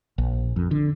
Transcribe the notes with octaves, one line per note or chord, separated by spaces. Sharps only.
A#1
F2
D3